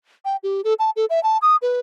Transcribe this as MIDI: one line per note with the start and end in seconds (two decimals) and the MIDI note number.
0.25 0.36 79
0.43 0.61 67
0.64 0.74 69
0.79 0.90 81
0.96 1.05 69
1.10 1.22 76
1.23 1.38 81
1.42 1.56 87
1.62 1.79 71